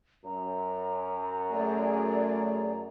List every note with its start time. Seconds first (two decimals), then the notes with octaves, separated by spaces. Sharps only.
0.25 F#2 A#5
1.52 A3 G#4 D5